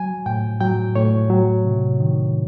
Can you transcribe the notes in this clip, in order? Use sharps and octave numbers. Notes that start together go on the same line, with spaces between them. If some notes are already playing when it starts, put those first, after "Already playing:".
Already playing: F#3 G#5
A2 G5
F#3 G5
A2 C#5
F#3
C3
D#3